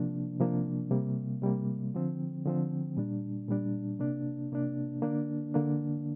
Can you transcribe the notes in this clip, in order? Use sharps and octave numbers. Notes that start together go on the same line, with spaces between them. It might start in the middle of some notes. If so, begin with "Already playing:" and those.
Already playing: C3 F3 A#3 D4
C3 F3 A#3 D4
C3 G3 A#3
C3 G3 A#3
D3 F3 C4
D3 F3 C4
A#2 G3 D4
A#2 G3 D4
C3 A#3 D4
C3 A#3 D4
D3 A#3 D4
D3 A#3 D4